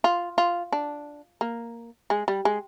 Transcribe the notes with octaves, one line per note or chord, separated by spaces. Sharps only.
F4
F4
D4
A#3
G#3
G3
G#3